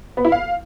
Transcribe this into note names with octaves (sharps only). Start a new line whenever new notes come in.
B3
E4
F5